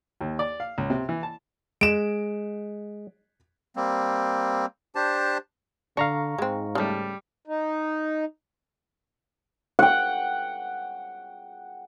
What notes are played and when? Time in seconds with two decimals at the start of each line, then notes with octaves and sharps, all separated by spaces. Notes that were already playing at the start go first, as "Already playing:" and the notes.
0.21 D#2
0.39 D5
0.60 F5
0.78 C#2
0.90 C3
1.09 E3
1.23 A5
1.81 G#3 D7 E7
3.76 G3 A#3 C4
4.95 D4 G4 C5 A5
5.97 D3 D4 F5 A#5 C#6
6.38 G#2 G#3 C4
6.75 C#3 G3 A3 A5 F6
7.47 D#4
9.79 F#5 G5